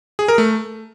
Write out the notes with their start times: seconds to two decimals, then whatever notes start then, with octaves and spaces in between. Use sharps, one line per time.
0.19 G#4
0.28 A#4
0.38 A3